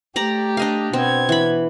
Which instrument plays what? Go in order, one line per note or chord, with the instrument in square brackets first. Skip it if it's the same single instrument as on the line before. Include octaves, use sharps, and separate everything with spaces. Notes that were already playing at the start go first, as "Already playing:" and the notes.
[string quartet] A3 G4 [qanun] D5 A#5
[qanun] D4 D#5 F5
[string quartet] B2 B3 G#6 [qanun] C4
[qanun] E3 B5